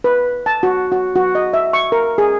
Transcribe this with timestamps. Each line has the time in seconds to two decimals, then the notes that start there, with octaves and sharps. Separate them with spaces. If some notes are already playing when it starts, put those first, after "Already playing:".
0.04 B4
0.46 A5
0.63 F#4
0.92 F#4
1.16 F#4
1.35 D#5
1.53 E5
1.73 C#6
1.92 A#4
2.18 G#4